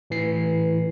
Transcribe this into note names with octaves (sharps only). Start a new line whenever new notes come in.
A2 E3 C7